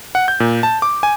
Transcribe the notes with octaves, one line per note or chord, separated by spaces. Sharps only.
F#5
G6
A#2
A5
D6
G#5